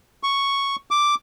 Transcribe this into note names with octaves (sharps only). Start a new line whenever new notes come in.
C#6
D6